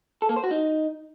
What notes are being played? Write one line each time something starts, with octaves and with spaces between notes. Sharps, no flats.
A4
A#3
C5
F#4
D#4